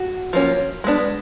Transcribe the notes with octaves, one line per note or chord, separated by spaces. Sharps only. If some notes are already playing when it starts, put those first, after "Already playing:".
Already playing: F#4
F3 A#3 C#4
G#3 B3 D4